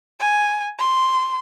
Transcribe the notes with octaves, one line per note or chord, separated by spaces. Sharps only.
G#5
C6